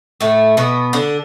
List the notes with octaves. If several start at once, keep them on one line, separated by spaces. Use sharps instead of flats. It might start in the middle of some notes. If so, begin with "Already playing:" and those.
A2 A3
B2 B3
D3 D4